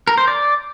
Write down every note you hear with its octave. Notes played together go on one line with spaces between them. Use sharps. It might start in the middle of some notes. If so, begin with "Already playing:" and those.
A#4
C5
D5